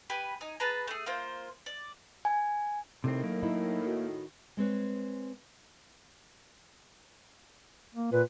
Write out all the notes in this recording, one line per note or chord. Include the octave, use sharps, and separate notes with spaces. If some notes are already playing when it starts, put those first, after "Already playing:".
G4 B4 G#5 B5
D#4 G#5
G#4 B4 A5 A#5
A3 G#4
A#3 F4 C5
D5
G#5
A2 C3 D#3 C4
F#3 A#3
D#4 E4
F#4
G#3 C4 B4 C#5
A#3
A#2 B4